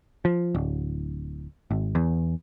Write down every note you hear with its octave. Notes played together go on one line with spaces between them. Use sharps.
F3
D1
G#1
E2